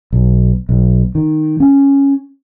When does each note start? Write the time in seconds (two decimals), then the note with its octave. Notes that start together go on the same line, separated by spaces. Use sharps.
0.13 B1
0.69 B1
1.15 D#3
1.60 C#4